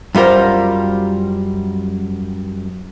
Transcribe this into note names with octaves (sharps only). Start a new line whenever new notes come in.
F#2 G3 F4 A#4 C5